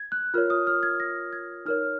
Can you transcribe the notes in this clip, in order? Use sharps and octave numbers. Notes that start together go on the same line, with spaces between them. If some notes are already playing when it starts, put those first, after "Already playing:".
Already playing: G#6
F#6
F4 A#4 C#5 F6
D#6
F6
G#6
A#6
G#6
D#4 A#4 C#5 F6